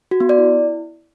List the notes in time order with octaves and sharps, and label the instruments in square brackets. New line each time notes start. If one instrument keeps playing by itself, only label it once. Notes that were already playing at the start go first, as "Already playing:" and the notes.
[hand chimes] F#4
B3
D5
E4